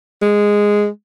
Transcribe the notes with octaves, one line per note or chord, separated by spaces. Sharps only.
G#3